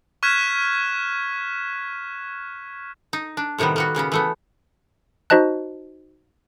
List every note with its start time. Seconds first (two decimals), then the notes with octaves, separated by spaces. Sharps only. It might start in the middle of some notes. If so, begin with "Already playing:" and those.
0.23 C#6 F6 F#6 G#6 B6 E7
3.13 D#4
3.37 D4
3.58 A2 C3 D#3 G3 B3
3.76 A#3 B3 F#4
3.95 A#2 C#3 A#3 B3
4.12 E3 A3 B3
5.30 D#4 F#4 C5 D#5 A5 F#6